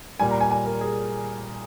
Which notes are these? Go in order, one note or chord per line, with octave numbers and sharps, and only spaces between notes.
A#2 G3 G#5
A#5
G#5
G#5
A#4
G#4